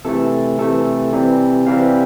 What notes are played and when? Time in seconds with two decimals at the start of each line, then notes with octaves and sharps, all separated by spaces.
0.05 C3 E3 A3 A4
0.59 C3 E3 A3 A4
1.13 C3 E3 G3 C4
1.66 C3 E3 G3 C4 F5